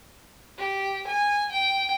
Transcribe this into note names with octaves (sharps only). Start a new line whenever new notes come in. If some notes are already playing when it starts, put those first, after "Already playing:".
G4
G#5
G5